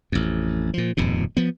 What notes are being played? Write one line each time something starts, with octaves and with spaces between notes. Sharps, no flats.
A1 F2
A#2 F3
D#1 F2 G#2 B2
F3 B3